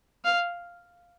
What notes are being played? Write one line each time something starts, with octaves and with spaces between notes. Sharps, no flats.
F5